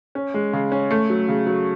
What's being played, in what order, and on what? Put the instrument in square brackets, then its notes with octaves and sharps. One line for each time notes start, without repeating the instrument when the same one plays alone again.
[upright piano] C#4
G#3
C#3
C#4
A3
F#3
C#3
F#3